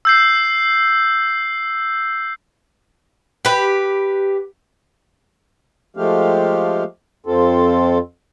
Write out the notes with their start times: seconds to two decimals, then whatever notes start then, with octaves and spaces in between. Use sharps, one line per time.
0.05 E6 G6 C7
3.45 G4 B4
5.97 F3 G#3 A3 G4 F5
7.26 F2 C4 F4 A4